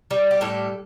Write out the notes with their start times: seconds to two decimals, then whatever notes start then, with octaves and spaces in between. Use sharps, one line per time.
0.11 G3
0.31 G4
0.41 A2 A4